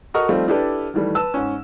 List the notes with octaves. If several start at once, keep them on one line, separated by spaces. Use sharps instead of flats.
F#4 A4 A#4 D#5 C#6 F6
F3 G3 A3 C4 D#4 F4
D4 E4 G4 A4 B4 D5
D#3 E3 G3 A3
B4 A5 E6
G#2 C#4